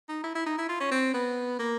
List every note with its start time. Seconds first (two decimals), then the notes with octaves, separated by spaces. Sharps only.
0.09 D#4
0.24 E4
0.35 E4
0.46 D#4
0.58 E4
0.69 F4
0.80 C#4
0.91 C4
1.14 B3
1.59 A#3